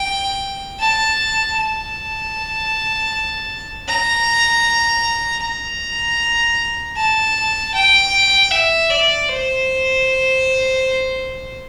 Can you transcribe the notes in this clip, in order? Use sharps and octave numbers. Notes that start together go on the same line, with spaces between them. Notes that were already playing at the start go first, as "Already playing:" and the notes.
Already playing: G5
A5
A5
A#5
A#5
A5
G5
E5
D5
C5